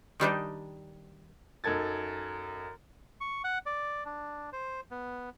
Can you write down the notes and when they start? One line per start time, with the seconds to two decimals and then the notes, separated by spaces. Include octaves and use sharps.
0.20 D#3 G3 D4 D#4
1.64 F#2 D#4 A4 G#6 A6
3.21 C#6
3.44 F#5
3.66 D5
4.05 D4
4.53 C5
4.91 B3